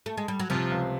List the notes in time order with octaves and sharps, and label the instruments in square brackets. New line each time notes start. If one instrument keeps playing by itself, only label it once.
[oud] A3
G#3
G3
F#3
[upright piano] C3 [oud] F3
[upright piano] C#2